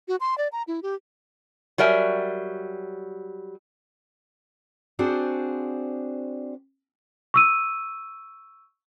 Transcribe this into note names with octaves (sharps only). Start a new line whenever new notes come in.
F#4
C6
D5
A#5
E4
G4
F#3 G3 A#4 E5 G#5
C4 D4 F#4 G#4 C5 D5
C#6 E6 D#7